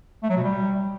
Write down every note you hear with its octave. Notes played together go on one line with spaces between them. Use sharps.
A3
F#3
B2
G3